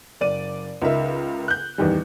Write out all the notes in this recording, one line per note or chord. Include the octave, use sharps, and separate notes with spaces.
F#1 D5 D#7
C#2 D#4 A#4 E5
F#6 G6
A1 E2 D#3 G3